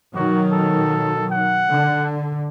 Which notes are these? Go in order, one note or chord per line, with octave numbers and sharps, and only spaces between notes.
B2 D#3 F#3 F#4
A4
F#5
D3